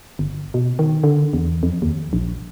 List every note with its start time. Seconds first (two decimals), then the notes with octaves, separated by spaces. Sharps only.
0.19 G1
0.54 B2
0.79 D#3
1.03 D3
1.33 E2
1.63 F2
1.82 D#2
2.13 A#1